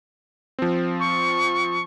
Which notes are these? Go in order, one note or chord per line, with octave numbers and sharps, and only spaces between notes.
F3 C4
C#6